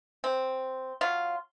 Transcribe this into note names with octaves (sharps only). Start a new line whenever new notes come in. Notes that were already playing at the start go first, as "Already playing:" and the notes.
C4
F#3 F4